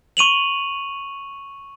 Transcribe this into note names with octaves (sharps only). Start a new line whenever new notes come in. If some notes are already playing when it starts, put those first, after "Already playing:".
C#6 D#7 F7 F#7